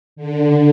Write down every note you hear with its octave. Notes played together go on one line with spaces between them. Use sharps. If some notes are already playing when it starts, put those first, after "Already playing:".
D3